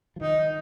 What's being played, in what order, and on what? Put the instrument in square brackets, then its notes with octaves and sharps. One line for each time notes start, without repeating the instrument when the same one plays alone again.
[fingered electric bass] F3
[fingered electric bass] D#3 [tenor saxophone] D#4